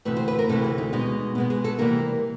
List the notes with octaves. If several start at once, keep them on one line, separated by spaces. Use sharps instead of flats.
D2 C3 E3 A3 B4
C5
B4
A#4
D2 C3 E3 A3 A4
G#4
D#4
B2 G#3 B3 D#4
B2 G#3 B3
G#4
A4
C3 E3 G3 A#3 A#4